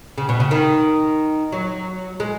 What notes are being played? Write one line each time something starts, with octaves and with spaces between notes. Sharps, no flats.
C#3
B2
C#3
D#3
F#3
G#3